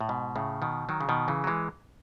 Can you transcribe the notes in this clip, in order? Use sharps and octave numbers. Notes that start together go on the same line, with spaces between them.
A2
G#2 B2
A2 C#3
B2 D#3
D#3 F#3
C#3
B2 D#3
C#3 E3
F#3
E3 G#3